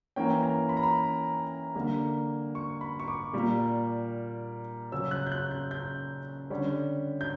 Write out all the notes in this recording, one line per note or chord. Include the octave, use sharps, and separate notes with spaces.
E3 A#3 C#4 G5
A#5
B5
A#5
B5
D3 G3 A#3
C#6
B5
C#6
D6
A#2 G3 A#3
C#3 F#3 C#4 E6
F#6
G6
F#6
G6
G6
D3 G3 C#4
G6